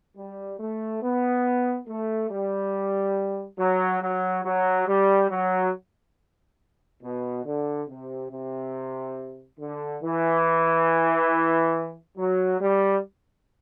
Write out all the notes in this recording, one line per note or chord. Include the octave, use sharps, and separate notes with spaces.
G3
A3
B3
A3
G3
F#3
F#3
F#3
G3
F#3
B2
D3
C3
C3
D3
E3
F#3
G3